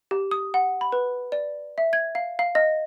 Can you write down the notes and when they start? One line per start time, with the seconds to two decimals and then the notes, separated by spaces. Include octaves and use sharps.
0.11 G4
0.31 D#6
0.54 F#5
0.81 B5
0.92 B4
1.32 D5
1.78 E5
1.93 G#6
2.15 F5
2.39 F5
2.55 D#5